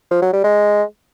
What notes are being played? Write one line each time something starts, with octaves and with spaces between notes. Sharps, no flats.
F3
F#3
G3
G#3